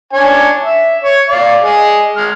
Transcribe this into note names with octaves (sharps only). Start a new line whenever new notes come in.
D4 C#5 G#5
E5
C#5
D5 F5
G#4 D#5
G#3 F6